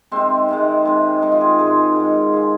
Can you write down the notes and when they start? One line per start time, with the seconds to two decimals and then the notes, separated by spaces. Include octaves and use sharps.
0.11 C3 D#3 G#3 C4
0.49 C3 D#3 G#3
0.85 C3 D#3 G#3
1.22 C3 D#3 G#3 D#4
1.32 F4
1.41 G#4
1.50 A#4
1.59 G#2 G#3 G#4
1.96 G#2 G#3
2.33 G#3 G#4